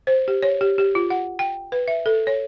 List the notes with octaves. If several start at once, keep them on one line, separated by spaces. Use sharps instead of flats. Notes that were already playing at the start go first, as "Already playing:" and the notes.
C5
G4
C#5
G4
G4
F4
F#5
G5
B4
E5
A4
C#5